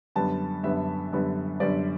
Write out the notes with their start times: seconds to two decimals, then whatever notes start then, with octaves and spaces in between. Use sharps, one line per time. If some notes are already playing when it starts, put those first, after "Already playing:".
0.15 F#2 D3 G3 B3 A5
0.63 F#2 D3 G3 B3 E5
1.12 F#2 D3 G3 B3
1.60 F#2 D3 G3 B3 D5